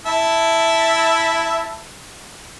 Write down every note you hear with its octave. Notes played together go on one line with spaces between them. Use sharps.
E4 E5 A5